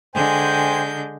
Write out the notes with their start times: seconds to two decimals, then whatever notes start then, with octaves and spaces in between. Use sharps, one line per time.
0.15 D3 G#3 C5 G5 G#5 G6